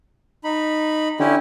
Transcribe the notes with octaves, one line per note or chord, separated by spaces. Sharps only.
D#4 B5
D3 C#4 E4 G4